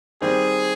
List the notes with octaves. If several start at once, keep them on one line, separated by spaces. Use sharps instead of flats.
D#3 G3 C4 G#4